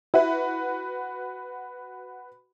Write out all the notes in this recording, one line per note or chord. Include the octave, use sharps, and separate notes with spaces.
E4 F#4 B4